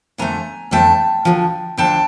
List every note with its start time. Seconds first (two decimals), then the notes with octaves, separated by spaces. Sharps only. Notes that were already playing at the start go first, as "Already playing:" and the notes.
0.18 F2 D3 F3 A3 G#5 A#5
0.71 F2 D3 F3 A3 G5 A5
1.25 D2 D3 F3
1.77 D2 D3 F3 G5 A5